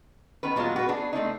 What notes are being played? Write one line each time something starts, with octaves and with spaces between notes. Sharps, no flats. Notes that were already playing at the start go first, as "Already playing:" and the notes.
D#3 B3 C#4 B4
A#2 F#3 G#3 B3 F4
F#4 B4
B3 D4 G#4
A3 C4 D4 D#4